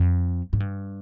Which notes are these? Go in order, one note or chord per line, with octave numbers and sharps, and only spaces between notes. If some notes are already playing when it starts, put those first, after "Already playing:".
Already playing: F2
G#2
G2